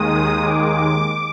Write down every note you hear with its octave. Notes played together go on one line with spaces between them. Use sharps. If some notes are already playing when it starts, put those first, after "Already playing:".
Already playing: D#2 D#3 G#3 D#6
D6